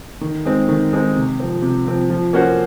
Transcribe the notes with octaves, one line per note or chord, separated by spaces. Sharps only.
D#3
G#3 C4 D#4
D#3
G#3 C4 D#4
C3
F3 C4
C3
F3 C4
F3
A#3 C#4 F#4 C5